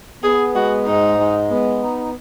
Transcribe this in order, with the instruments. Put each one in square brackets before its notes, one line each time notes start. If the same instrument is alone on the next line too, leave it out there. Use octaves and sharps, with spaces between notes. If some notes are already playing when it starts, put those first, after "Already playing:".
[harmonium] B3 [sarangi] G#4
[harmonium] G#3 [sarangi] F#4
[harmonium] G#2 [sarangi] D#4
[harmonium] G#3
B3
D#4